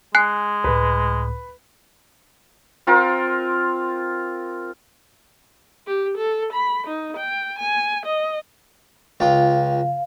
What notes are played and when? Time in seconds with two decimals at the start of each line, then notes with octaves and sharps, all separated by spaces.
0.15 G#3 G#5 F#6 C7
0.64 C#2 A2 B4
2.87 C4 F4 A#4
5.87 G4
6.17 A4
6.53 B5
6.87 D#4
7.17 G5
7.58 G#5
8.06 D#5
9.20 C#2 F4 F5 G5